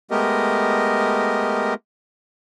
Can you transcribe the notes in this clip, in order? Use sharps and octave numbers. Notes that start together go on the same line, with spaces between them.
G#3 A3 B3 G4 A#4 D#5